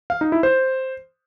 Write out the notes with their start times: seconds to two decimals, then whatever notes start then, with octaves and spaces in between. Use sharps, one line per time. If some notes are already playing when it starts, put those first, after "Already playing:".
0.10 F5
0.21 D#4
0.32 E4
0.43 C5